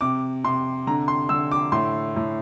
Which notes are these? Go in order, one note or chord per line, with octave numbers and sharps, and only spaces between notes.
C3 D6
C3 C6
D3 A#5
C6
D3 E6
D6
A2 C6
A2